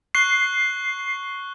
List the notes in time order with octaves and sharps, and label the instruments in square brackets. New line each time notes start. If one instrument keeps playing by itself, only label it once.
[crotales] C#6 F#6 G7 [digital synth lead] C7